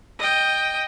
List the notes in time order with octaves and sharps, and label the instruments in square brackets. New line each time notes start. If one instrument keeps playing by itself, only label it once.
[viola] D#5 G5